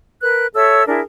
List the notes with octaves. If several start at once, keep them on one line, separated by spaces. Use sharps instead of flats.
A#4 B4 F#6
A4 C#5 E5 E6
D4 E4 G#4 A#4